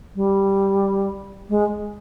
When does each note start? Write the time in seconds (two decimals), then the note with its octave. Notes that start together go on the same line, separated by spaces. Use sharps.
0.16 G3
1.49 G#3